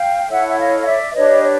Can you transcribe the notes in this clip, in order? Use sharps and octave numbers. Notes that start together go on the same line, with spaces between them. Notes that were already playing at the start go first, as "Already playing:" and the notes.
Already playing: F5 G5
E4 A4 C#5 E5 F#5
E5
D#5 F5
D5 E5
D4 G4 B4 C#5 D#5
C#5